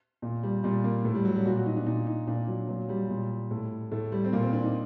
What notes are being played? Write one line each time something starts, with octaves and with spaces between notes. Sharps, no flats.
A#2
G3
A#2 G3
A#3
A2 A3
G3
F#3
G3
A#2 F#4
F#4
D#4
D4
A#2 D#4
D#4
A#2 D4
F#3
A#2 F#3
G3
A#2
A2
A2 A3
G3
C4
A#2 A#3
C4
D4
D#4